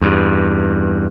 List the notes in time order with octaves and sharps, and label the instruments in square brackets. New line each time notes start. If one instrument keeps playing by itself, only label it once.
[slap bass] E2 G2